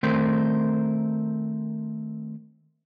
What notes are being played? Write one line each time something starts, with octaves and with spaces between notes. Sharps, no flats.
D#3 A3 C4 A#4 C5